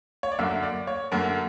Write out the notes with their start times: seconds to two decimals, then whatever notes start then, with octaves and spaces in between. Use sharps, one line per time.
0.23 C#5
0.32 D5
0.39 F#2 D3 A#3 E5
0.63 D5
0.87 C#5
1.12 F#2 D3 A#3 A#4